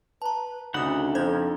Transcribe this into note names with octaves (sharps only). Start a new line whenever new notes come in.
B4 A5 A#5
D2 C#3 D4 D#4 F#5 B5 D#6
F2 C5 G6 G#6